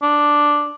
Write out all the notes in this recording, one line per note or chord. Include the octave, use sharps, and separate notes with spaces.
D4